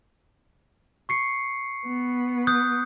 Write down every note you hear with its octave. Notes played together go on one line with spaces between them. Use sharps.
C#6 C7 C#7
B3
D#6 F#6 G6